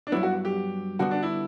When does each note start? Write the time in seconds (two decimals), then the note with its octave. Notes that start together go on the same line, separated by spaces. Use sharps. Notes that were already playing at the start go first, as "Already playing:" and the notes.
0.07 D4
0.12 G2 F#3 B3 E4
0.23 F#4
0.45 G4
0.99 D3 G3 B3 F#4
1.11 D4
1.23 E4